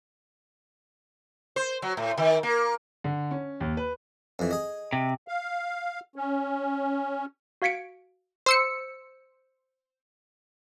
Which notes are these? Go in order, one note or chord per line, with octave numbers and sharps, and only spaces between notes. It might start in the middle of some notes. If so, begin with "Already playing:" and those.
C5
F#3
A2
D#3
A#3
D3
C#4
D#2
B4
F2 E3
G#4 D#5
C3
F5
C#4
F#4 F5 G#6 B6 C#7 D7
C5 E6 C#7